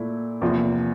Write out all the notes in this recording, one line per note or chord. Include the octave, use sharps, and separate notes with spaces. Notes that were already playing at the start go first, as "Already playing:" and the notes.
Already playing: A#2 A3 E4
E2 C3 F3 A#3 F4